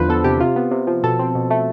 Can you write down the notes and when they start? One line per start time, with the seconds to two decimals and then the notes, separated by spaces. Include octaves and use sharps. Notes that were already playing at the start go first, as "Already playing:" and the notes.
Already playing: E2 D3 F3 B4 C5
0.09 B3 A4
0.24 C3 G4
0.40 C3 F4
0.56 B3
0.71 C3
0.87 F3
1.03 B2 A4
1.19 C4
1.35 B2
1.51 A3